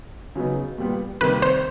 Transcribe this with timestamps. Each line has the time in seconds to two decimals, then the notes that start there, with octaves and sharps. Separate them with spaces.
0.36 C#3 F#3 B3 D#4
0.78 A#2 G3 B3
1.21 C3 D#3 G3 A#3 B4
1.42 C5